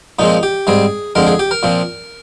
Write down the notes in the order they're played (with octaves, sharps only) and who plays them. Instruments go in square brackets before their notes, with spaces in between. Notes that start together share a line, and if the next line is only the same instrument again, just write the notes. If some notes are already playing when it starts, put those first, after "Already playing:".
[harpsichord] A#2 F3 G#3 C4 D#4
G4
G#2 G3 C4 G#4
F2 D3 G#3 C4 A#4
G#4
G4
A#4
A#2 F3 C4